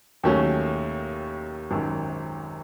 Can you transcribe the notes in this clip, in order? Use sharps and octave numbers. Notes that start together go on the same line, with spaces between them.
D#2 D#3 F#3 A3 C#4
G#1 F#2 D#3